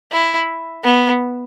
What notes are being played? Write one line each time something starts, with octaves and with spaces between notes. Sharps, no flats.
E4
B3